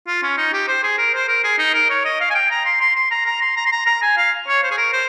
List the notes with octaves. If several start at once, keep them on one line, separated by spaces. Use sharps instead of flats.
F4
C#4
D#4
G4
C5
G#4
A#4
C5
A#4
G#4
D#4
A#4
C#5
D#5
F5
G#5
G5
A#5
C6
C6
C6
A#5
A#5
C6
A#5
C6
A#5
A#5
G#5
F5
C#5
C5
G#4
A#4
C5